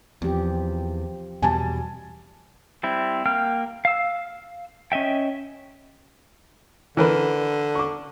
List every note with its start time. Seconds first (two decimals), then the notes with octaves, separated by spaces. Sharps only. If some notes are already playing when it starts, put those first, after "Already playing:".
0.22 E2 F3 C4 G4
1.42 E2 B2 G3 G#5 A5
2.83 G3 C4 E4
3.26 A#3 G5 F6
3.85 F5 E6
4.92 C#4 D#5 E5 G5
6.97 D3 E3 A#4 B4
7.75 C#6 D6